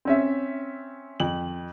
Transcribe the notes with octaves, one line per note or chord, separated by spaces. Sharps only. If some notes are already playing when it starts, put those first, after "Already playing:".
C4 C#4 E5
F2 F#7